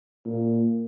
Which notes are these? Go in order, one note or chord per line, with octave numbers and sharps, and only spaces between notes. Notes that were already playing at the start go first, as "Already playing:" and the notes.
A#2